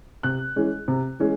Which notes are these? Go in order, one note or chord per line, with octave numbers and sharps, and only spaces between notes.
C3 F#6
E3 G#3 C#4
C3
E3 G#3 C#4